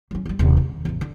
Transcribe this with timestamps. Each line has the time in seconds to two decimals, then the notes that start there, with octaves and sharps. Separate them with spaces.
0.11 F#3 C#4
0.25 E2 G3
0.39 D#1 C3
0.57 D#3
0.85 A1 E2
1.01 D3